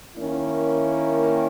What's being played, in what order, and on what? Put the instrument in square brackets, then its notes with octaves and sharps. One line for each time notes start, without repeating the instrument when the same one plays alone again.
[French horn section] D#3 A#3 C#4 E4